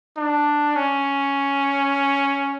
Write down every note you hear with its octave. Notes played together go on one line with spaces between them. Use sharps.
D4
C#4